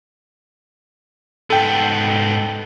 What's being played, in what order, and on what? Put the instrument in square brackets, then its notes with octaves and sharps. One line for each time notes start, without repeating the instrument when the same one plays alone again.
[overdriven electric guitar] G#2 B3 [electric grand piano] A4 G5